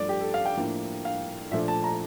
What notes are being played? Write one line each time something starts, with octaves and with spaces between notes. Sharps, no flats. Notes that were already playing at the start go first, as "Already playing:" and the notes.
Already playing: G2 F3 A3 D4 D5
G4
A4
F5
G5
A2 F3 A#3 D4
F5
A#2 F3 A3 D4 E5
A5
A#5